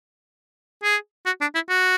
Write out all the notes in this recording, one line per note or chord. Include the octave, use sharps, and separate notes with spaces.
G#4
F#4
D4
E4
F#4